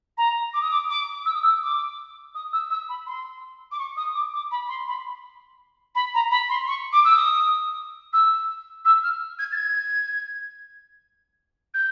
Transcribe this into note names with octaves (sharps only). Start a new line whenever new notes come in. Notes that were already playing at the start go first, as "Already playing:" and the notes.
A#5
D6
D#6
D6
D6
E6
D#6
E6
D6
D#6
E6
E6
B5
C6
D6
C#6
D#6
D6
D6
B5
C6
B5
B5
A#5
B5
C6
C#6
D6
E6
D#6
E6
E6
F6
G#6
A6
G#6
G6